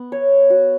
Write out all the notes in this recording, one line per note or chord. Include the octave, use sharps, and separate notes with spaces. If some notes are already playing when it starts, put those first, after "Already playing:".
Already playing: B3
C#5
F#4